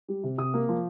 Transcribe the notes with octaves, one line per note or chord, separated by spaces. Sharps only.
G3
C3
C3 D#6
A#3
F3